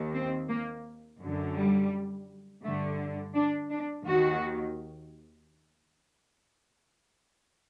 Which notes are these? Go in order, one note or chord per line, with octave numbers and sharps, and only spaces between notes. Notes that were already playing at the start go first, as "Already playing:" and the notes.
Already playing: D#2 D#3
C4
A#3
F#2 D3
G3
G2 D3 A3
D4
D4
D#2 D#3 F#4